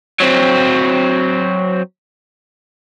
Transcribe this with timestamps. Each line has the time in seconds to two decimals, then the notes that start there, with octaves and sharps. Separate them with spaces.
0.20 F#3 C4